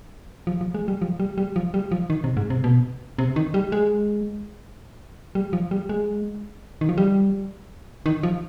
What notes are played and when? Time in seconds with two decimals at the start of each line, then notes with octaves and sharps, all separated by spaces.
0.47 F3
0.61 F3
0.74 G#3
0.88 G3
1.02 F3
1.20 G3
1.38 G3
1.56 F3
1.74 G3
1.92 F3
2.10 D#3
2.24 C3
2.37 G#2
2.50 C3
2.64 B2
3.18 C3
3.36 D#3
3.54 G3
3.72 G#3
5.35 G3
5.53 F3
5.71 G3
5.89 G#3
6.81 D#3
6.89 F3
6.98 G3
8.06 D#3
8.23 F3